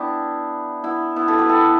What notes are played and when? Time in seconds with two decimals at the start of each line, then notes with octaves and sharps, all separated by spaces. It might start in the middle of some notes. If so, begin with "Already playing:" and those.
Already playing: B3 D4 E4 G4
0.84 B3 E4
1.16 B3 E4
1.28 E4 A4
1.38 G4 B4
1.49 E4 A4